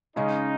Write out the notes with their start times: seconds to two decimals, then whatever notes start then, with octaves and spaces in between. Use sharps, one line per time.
0.16 C#3 G#3 C#4 D#4